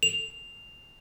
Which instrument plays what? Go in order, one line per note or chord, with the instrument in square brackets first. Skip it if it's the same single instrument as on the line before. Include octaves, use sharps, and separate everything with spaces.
[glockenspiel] F7